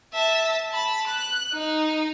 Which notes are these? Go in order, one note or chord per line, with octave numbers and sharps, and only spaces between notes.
E5 A5
A5 B5
F#6
D#4